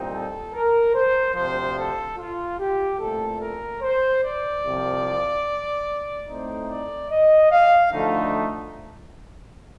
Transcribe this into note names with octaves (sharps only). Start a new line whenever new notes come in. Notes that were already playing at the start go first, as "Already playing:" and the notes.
Already playing: C2 A#2 G3 C4 D#4
A4
A#4
C5
D2 C3 F3 C5
A4
F4
G4
C2 A#2 A3 A4
A#4
C5
D5
C2 C3 F3
A2 A3 C4 D#4 C5
D5
D#5
F5
D2 D3 F3 A3 D#4